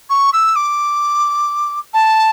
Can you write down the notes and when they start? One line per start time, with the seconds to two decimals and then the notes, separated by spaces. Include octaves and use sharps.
0.10 C#6
0.33 E6
0.56 D6
1.93 A5